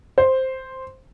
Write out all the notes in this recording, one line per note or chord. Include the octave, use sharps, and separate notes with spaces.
C5